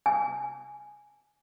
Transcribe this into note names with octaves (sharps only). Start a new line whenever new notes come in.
G#5